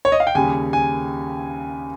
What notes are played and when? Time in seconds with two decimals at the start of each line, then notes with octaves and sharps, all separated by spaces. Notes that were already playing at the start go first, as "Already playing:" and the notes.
0.05 C#5
0.12 D#5
0.20 F5
0.27 G5
0.35 D#2 C#3 G3 G#5
0.73 G#5